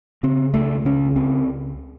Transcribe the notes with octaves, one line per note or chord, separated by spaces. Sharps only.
C#3 C4
C#2 A3
C#3 C#4
C#2 C4